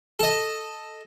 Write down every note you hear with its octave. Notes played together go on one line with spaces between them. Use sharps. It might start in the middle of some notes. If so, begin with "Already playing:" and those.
A4 D#5